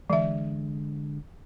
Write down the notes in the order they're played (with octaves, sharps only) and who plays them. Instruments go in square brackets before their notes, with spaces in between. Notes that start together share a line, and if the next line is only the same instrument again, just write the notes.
[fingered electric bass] D3 G#3 [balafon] E3 E5